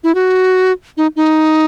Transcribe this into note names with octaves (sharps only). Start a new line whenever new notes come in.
E4
F#4
D#4
D#4